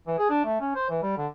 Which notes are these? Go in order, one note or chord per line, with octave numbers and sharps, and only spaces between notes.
E3
G#4
D4
A3
C#4
C5
E3
G3
D3